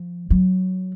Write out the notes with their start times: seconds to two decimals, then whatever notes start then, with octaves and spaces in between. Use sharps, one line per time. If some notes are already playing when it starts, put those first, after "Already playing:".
Already playing: F3
0.30 F#3